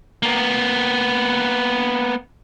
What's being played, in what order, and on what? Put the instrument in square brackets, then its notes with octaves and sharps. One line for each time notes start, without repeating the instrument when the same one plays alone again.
[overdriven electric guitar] A#3 B3